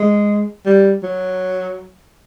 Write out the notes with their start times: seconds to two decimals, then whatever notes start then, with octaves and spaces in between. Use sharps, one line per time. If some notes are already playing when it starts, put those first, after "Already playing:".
Already playing: G#3
0.66 G3
1.03 F#3